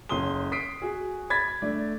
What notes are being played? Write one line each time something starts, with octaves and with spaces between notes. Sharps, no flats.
F#1 C#5 C6 D#6 G7
D#6 B6 C7 D7
F#4 G#4
B5 G#6 A6 B6
A3 D4